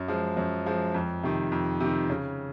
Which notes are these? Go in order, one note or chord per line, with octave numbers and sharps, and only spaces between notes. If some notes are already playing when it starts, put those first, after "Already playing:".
Already playing: F#2
F3 G#3
F#2
F3 G#3
F2
C3 D#3
F2
C3 D#3
C#3